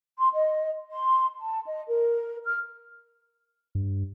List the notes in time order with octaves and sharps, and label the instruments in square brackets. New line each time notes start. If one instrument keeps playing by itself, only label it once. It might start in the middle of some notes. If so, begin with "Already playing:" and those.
[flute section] C6
D#5
C6
A5
D#5
A#4
F6
[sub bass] G2